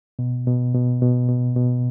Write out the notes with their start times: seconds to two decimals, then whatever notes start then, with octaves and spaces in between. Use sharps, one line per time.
0.19 B2
0.47 B2
0.74 B2
1.02 B2
1.29 B2
1.56 B2